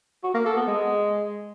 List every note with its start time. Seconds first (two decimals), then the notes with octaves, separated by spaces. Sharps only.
0.24 F#4
0.35 A#3
0.45 A4
0.56 B3
0.67 G#3